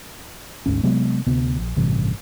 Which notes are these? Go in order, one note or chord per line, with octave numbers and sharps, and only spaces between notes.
G#1 D2 G#2 C#4
C3 F#3 G#3 B3
D2 C3 B3
A#1
A1 G2 C3 E3